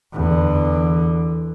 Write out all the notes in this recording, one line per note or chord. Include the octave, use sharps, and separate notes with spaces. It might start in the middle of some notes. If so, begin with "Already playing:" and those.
E2 D3